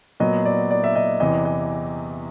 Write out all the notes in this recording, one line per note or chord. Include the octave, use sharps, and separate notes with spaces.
A#2 F#3 B3 D#5
D5
D5
E5
D#5
E2 C3 E3 D#5
D#5